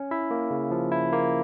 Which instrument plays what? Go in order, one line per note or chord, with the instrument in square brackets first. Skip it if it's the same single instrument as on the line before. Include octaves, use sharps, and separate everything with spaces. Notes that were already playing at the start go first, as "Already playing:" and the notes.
Already playing: [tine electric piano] C#4
E4 E5
A#3
C#3
F3
E4
A#3